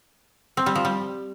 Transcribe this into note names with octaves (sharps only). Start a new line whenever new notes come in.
C4
G3
F3
G3